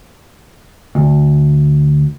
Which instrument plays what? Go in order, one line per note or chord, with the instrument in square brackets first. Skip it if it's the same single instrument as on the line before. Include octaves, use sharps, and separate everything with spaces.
[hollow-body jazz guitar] D2